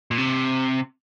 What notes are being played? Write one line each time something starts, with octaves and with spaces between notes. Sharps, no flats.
A#2
C3